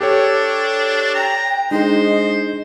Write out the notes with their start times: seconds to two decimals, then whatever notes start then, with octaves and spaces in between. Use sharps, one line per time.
0.01 D4 G4 A4 C#5
1.15 G5 A#5
1.71 G#3 D4 D#4 G#4 C5 D#5